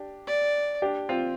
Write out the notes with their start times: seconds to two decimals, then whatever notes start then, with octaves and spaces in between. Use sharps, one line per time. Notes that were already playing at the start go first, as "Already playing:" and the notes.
Already playing: D4 G4
0.27 D5
0.82 D4 G4
1.09 C4 F4